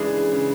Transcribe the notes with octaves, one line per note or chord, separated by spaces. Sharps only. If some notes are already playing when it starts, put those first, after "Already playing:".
Already playing: C#3 E3 G#3 D4 G#4
C#3